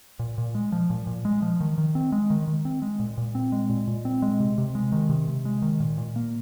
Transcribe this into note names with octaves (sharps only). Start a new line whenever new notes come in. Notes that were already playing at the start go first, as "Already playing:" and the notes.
A#2
A#2
G#3
F3
A#2
A#2
G#3
F3
D#3
D#3
C4
G#3
D#3
D#3
C4
G#3
A#2
A#2
C4
G#3
A#2
A#2
C4
G#3
C3
C3
G#3
D#3
C3
C3
G#3
D#3
A#2
A#2
A#3